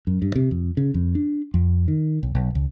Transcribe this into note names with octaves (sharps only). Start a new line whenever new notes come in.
F#2
G2
C3
F2
C#3
F2
D4
F2
D#3
B1
B1
C#2